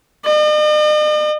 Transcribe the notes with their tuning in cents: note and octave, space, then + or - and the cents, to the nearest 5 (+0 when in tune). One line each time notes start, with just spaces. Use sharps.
D#5 -45